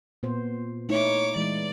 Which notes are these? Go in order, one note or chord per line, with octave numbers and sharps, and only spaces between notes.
A#2 B3 C5
A3 D#4 E4 C#5 D6
E3 G#3 D5